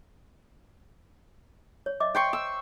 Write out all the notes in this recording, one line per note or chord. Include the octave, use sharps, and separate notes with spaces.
C#5
D#5 E5 D6
G5 C6 C#6
E6